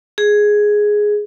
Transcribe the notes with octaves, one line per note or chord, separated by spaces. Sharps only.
G#4